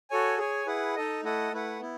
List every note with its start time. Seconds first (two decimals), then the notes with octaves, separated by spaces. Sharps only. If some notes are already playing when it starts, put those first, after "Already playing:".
0.10 F#4 A4 C#5 G#5
0.38 G#4 C#5 G#5
0.67 E4 G#4 B4 F#5
0.96 D#4 A4 D#5
1.24 A3 E4 A4 D#5 F#5
1.52 A3 E4 B4 F#5
1.81 B3 E4